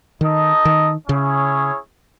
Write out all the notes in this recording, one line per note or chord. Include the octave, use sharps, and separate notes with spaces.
D#3 D#4 A4 D#5
D#3
C#3 C#4 E4 G#4 C#5